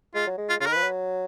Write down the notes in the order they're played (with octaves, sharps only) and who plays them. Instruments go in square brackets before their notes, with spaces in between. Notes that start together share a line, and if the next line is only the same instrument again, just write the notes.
[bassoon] G#3 [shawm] F4
[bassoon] F#3
G#3
[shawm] F4
[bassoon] C#3 [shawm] F4
[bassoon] D#3 [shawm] A#4
[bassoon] F3 [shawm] B4
[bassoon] F#3